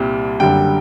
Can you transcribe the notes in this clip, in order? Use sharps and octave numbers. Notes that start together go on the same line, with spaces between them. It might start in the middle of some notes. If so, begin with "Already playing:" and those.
Already playing: C2 A#2 G3 C4
F#1 F#2 D3 G3 G5